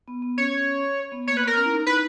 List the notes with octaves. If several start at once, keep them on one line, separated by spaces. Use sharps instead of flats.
B3
B3
C#4 C#5
B3
A#3 C#5
B4
B3
A#4
C#4
E4
D#4
B4